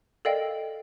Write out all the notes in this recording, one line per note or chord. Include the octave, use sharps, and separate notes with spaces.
A4 A#4 D5 D#5 F5 G5